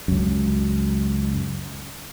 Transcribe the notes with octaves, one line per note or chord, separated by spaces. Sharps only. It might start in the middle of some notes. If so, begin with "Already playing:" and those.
C#2 F#2